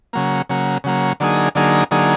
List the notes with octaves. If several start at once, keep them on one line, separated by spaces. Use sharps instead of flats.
C#3 F#3 A#3
C#3 F#3 A#3
C#3 F#3 A#3
D3 F#3 A#3 D#4 G#4
D3 F#3 A#3 D#4 G#4
D3 F#3 A#3 D#4 G#4